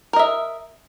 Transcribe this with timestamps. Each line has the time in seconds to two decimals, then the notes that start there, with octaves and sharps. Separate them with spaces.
0.13 A#4
0.16 D#5
0.19 E5